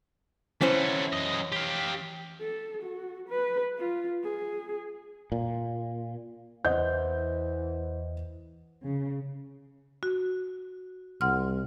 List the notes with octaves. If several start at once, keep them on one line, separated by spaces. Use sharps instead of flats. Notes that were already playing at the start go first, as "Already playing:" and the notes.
E3 F#3 A3 C#4 C5
F#2 D#5
G4 F5
A4
F#4
B4
F4
G#4
A#2
E2 E3 C5 D#5 F#5 G6
C#3
F#4
C2 F#5 C6 F6